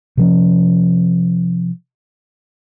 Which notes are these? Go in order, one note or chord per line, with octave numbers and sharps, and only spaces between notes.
C3 F3 C#4